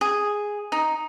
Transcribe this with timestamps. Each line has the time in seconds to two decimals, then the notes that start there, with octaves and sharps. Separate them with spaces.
0.01 G#4
0.72 D#4